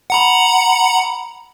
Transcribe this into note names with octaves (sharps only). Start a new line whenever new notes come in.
F#5 A#5 B5